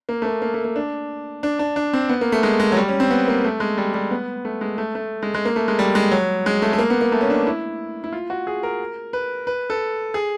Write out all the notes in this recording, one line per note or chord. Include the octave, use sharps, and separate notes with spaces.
A#3
A3
A#3
A#3
A3
A#3
D4
D4
D4
D4
C4
B3
A#3
A3
G#3
G#3
F#3
G3
C#4
C4
B3
A#3
A3
G#3
G3
G3
B3
A3
G#3
A3
A3
G#3
G#3
A#3
A3
G#3
G3
G#3
F#3
G#3
A3
A3
A#3
B3
A#3
A3
C#4
D4
E4
E4
F4
F#4
G#4
A#4
B4
B4
A4
G#4